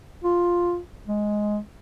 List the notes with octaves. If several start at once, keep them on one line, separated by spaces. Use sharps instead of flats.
F4
G#3